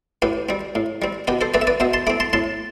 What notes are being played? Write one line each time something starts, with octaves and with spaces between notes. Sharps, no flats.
A2 G4 B4
G3 C4
A2
G3 C4
B2 G4 B4
A4 C5
A3 C4 B4 D5
E5
B4 D5
B2 C5 E5
A5 C6
A3 C4 B5 D6
A5 C6
A2 A5 C6